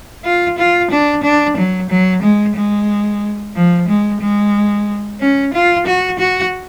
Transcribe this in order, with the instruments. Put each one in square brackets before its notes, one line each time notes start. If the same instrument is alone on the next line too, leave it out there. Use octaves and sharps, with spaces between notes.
[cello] F4
F4
D4
D4
F#3
F#3
G#3
G#3
F3
G#3
G#3
C#4
F4
F#4
F#4